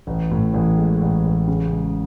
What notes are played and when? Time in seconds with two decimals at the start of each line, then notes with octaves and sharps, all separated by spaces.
0.07 A1
0.31 A2
0.54 A1
0.78 G#3
1.02 A1
1.25 A1
1.48 C#3
1.72 G#3